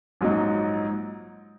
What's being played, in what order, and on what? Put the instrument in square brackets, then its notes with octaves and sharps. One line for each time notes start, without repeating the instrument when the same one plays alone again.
[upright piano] A#1 G#2 F#3 D#4